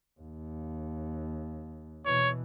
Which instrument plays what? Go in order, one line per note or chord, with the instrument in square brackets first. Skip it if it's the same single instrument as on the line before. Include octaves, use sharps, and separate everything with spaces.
[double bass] D#2
[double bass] B2 E3 [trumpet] C#5